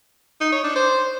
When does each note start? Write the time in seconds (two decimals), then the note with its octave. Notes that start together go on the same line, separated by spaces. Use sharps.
0.41 D#4
0.52 C#5
0.64 D4
0.76 C5